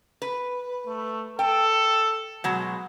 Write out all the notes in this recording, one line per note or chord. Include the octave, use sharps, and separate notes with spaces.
B4
A3
A4 G5
B2 F#3 G#3